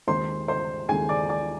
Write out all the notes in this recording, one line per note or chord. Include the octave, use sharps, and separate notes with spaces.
D#2 D#3 G#3 C4 C5 C6
C5 C6
D#2 D#3 G#3 C4 G#4 G#5
D5 D6
D5 D6